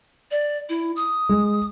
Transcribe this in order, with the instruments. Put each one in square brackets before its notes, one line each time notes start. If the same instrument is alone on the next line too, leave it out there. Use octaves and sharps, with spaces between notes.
[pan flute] D5
E4
D#6
[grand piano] G#3